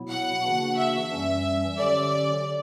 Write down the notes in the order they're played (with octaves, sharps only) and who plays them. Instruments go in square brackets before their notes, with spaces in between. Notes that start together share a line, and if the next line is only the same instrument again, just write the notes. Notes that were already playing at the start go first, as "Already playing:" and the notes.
Already playing: [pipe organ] B2 F#3 B3 E4
[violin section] F#5
[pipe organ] C#3 E3 A#3 D4 F#4
[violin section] E5
[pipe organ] F#2 E3 G3 C#4
[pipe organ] D3 F#3 C#4 G4 [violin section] D5